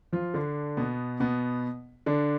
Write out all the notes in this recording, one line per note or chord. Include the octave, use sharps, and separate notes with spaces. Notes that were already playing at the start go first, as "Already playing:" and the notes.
F3 F4
D3 D4
B2 B3
B2 B3
D3 D4